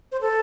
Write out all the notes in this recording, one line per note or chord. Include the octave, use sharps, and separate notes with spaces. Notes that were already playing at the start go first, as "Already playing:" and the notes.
C5
A4